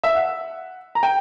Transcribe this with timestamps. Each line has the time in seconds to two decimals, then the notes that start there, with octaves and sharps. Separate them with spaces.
0.04 E5
0.15 F#5
0.95 A#5
1.03 G5